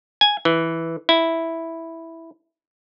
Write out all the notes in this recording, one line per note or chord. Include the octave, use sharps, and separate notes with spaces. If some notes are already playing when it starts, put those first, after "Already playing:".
G#5
E3
E4